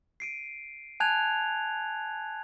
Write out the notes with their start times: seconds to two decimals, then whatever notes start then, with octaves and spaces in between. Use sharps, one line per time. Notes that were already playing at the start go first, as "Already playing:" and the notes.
0.20 C7 D7 D#7
1.00 G#5 A5 F#6 G#6 F7